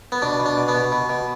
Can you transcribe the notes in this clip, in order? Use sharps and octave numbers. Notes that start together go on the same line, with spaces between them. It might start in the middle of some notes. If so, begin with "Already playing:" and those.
B3
B2 D4
B2
D4
B2
B3
B2
B2
B2